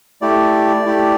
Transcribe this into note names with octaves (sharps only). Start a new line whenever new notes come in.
A3 E4 G4 D5
A3 E4 G4